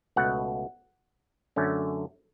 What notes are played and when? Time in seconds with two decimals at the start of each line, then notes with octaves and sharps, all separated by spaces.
0.16 C#2 B2 A3 F#5
1.56 F#2 D3 A3 C#4